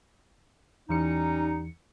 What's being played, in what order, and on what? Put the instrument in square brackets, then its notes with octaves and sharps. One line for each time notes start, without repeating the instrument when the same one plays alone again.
[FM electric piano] E2 E3 C#7 [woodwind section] G3 C#4 D#4